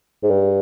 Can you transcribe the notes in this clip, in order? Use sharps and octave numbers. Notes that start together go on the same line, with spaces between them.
G#2
G2